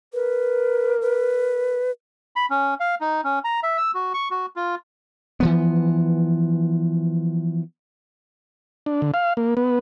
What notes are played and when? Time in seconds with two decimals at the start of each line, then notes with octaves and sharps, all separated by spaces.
0.13 A#4 B4
1.02 B4
2.36 B5
2.50 C#4
2.80 F5
3.01 D#4
3.24 C#4
3.44 A#5
3.63 E5
3.78 E6
3.95 F#4
4.14 C#6
4.31 F#4
4.56 F4
5.40 E3 F3 B3
8.86 D4
9.02 D3
9.14 F5
9.37 A#3
9.57 B3